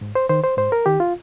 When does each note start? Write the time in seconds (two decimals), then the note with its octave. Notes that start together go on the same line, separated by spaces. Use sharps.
0.01 G#2
0.15 C5
0.29 D#3 C5
0.44 C5
0.57 G#2 C5
0.72 A#4
0.86 D#3 G4
1.00 F4